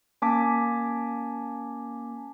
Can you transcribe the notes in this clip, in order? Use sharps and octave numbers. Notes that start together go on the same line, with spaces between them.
A#3 C#4 G#5 A5 D6 B6